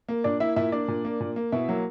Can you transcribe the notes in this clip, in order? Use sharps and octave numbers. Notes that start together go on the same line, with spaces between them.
A#3
A#2 D4 D5
A#3 E4 E5
A#2 E4 E5
A#3 D4 D5
A#2
A#3
A#2
A#3
B2 E4 E5
F#3 A#3